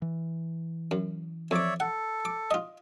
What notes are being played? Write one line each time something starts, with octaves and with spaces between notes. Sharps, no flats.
E3
F#2
F2 C#5 D5 E5 D6
A4 F#5
D6
F4 D#5